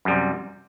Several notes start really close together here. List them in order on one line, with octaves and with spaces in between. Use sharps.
F#2 G3 C3